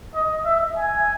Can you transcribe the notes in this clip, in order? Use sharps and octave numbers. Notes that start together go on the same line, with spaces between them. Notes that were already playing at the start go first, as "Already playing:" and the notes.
D#5
E5
G#5